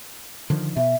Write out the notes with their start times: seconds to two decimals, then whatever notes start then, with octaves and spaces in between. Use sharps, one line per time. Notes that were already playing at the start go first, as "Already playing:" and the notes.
0.50 D3 D#3 F3
0.77 B2 E5